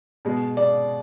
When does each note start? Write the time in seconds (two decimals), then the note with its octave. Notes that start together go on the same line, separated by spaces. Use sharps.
0.25 B2 G#3
0.57 D5